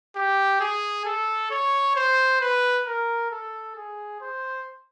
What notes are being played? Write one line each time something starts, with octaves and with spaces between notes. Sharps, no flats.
G4
G#4
A4
C#5
C5
B4
A#4
A4
G#4
C5